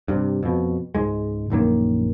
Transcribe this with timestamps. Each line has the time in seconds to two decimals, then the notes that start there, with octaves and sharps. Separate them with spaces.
0.08 G2 C3
0.43 F2 B2
0.95 C#2 G#2 G#3
1.50 A#1 F#2 D#3 A#3